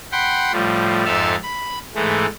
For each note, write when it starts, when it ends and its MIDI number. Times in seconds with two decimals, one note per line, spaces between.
0.12 0.52 78
0.12 0.52 79
0.12 0.52 83
0.12 0.52 84
0.53 1.05 45
0.53 1.05 53
0.53 1.05 55
0.53 1.05 65
1.05 1.36 41
1.05 1.36 44
1.05 1.36 65
1.05 1.36 69
1.05 1.36 76
1.05 1.36 77
1.43 1.79 83
1.95 2.26 44
1.95 2.26 52
1.95 2.26 56
1.95 2.26 57